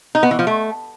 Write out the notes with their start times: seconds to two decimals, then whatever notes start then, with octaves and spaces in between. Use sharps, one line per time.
0.15 D#4
0.23 B3
0.31 E3
0.39 F3
0.47 A3